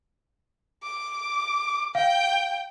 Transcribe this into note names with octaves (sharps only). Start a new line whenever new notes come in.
D6
F5 G5